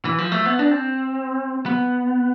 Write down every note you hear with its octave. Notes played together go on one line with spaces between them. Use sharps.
E3
F3
A3
B3
D4
C4
B3